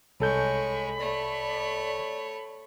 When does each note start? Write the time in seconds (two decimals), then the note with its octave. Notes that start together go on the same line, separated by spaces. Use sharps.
0.20 C2 G#3 A4 C#5 B5 C#6 G6
0.99 A3 C#5 D5